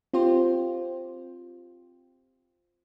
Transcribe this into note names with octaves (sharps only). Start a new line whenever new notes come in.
C4 F4 G4 C5